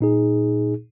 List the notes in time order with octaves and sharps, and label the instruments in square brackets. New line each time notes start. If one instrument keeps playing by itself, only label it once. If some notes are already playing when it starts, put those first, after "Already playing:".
[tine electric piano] A#2 D#4 G#4